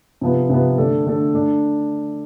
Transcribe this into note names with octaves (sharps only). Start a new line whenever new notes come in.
C3 F3 B3
C3 F3 B3
D3 A3 D4 A4
D3 A3 D4 A4
D3 A3 D4